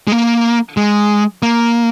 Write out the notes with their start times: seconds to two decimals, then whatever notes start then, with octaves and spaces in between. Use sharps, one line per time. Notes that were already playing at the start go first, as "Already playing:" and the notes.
0.07 G#3
0.12 A#3
0.77 G#3
1.42 A#3